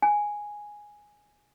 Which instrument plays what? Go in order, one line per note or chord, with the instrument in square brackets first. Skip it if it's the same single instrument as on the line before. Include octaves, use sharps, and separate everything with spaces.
[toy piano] G#5